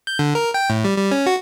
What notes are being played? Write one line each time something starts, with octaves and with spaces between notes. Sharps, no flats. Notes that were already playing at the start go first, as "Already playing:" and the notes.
G6
D3
A#4
G5
A2
G3
G3
C#4
F#4